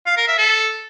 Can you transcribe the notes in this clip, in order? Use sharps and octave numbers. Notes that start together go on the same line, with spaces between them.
F5
A#4
E5
A4